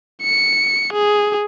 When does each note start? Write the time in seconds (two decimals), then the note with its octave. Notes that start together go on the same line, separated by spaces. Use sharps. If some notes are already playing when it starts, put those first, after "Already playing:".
0.22 C#7
0.93 G#4